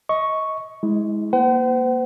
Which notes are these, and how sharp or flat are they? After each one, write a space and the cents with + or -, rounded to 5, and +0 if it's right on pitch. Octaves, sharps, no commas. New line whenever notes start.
D#5 +25 C#6 +0
G#3 +0 E4 -35
A#3 +15 C5 -40 F#5 +40